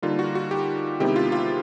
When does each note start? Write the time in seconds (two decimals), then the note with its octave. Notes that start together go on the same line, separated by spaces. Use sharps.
0.02 D3 G3 A#3 D#4 F4
0.19 F#4
0.35 F#4
0.51 G4
1.00 C3 D#3 G#3 B3 E4 G4
1.16 F4
1.32 F4